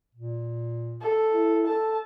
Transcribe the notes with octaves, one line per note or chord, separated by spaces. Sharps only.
A#2
A4
E4
A4 A5